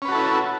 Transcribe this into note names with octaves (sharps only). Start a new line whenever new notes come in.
C#4 E4 F#4 A4 B4